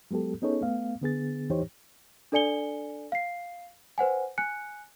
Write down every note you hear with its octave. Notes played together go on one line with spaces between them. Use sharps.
F#3 G#3 B3 G4 A4
B3 C#4 D#4 G#4 A4 C#5
A3 B3 F5
D3 B3 G#4 A6
E2 E3 D#4 G4 C5 C#5
D4 A4 D5 G#5 C#7 G7
F5 C7
B4 C5 F#5 G#5
G#5 F#6 C#7